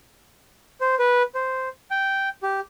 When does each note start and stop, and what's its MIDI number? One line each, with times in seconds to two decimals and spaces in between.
0.81 0.95 72
0.99 1.23 71
1.35 1.68 72
1.91 2.29 79
2.43 2.60 67